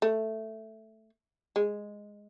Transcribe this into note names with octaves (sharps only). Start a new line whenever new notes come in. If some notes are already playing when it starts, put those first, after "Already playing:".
A3
G#3